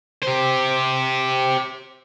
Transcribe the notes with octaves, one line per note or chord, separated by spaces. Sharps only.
G4 C5